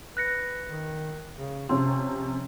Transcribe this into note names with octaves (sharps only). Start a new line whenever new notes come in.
B4 F#6 A#6 C#7
D#3
C#3
C3 F3 C#4 C6